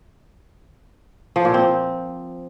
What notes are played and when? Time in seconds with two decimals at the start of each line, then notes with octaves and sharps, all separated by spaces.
1.36 F3
1.45 A#2
1.54 C4